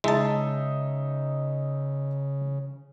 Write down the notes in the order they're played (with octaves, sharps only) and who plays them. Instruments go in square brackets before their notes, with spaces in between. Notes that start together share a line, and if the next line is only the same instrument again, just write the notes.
[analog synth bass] C#3 [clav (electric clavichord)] G#3 A5 [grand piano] D#4 E5